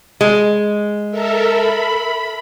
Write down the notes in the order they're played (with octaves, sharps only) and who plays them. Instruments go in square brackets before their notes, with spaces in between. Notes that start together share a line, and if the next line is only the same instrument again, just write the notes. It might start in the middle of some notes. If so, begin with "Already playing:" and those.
[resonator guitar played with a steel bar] G#3
[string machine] A4 A#4 E5
B5